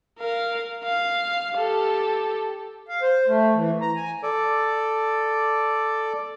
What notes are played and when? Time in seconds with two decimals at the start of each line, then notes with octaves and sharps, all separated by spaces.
0.19 A#4 F5
0.84 F5
1.56 G4 A4
2.89 F5
3.02 C5
3.28 A3
3.55 E3
3.81 A#5
3.96 G#5
4.23 A4 D5